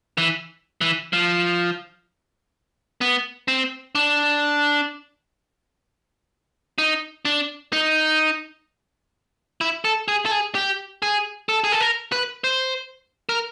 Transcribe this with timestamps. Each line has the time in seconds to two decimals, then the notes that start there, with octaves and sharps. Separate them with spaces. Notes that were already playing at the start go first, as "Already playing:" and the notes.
0.18 E3
0.81 E3
1.13 F3
3.01 B3
3.48 C4
3.95 D4
6.78 D#4
7.25 D4
7.73 D#4
9.61 E4
9.85 A4
10.08 G#4
10.26 A4
10.31 G#4
10.55 G4
11.02 G#4
11.49 A4
11.64 G#4
11.72 A4
11.80 A#4
12.12 B4
12.44 C5
13.29 A#4